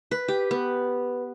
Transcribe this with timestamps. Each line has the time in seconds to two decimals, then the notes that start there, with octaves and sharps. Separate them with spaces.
0.11 B4
0.28 G4
0.51 B3